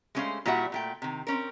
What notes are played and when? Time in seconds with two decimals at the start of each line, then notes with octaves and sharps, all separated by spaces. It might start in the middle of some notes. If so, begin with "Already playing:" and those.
0.15 G#3 A3 C#4 G#4 C5 F5
0.46 A#2 G3 E4 F#4 E5 F#5
0.72 A#2 A3 G5
1.02 C3 D#3
1.27 C4 C#4 A#4